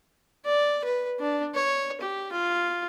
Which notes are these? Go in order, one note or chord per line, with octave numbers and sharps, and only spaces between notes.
D5
B4
D4
C#5
G4
F4